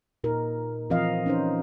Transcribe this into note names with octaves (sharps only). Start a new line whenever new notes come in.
A#2 D#4 A#4
E3 F3 C4 A#4 D#5 F5
C#4 D#4 C5